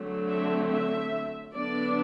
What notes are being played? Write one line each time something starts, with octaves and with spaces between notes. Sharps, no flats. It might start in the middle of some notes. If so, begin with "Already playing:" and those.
Already playing: D3 F#3 A3 C4
E5
E5
D3 F#3 B3 D4 D5